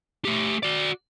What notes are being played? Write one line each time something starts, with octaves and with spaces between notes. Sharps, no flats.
A3 G4
F#4 D5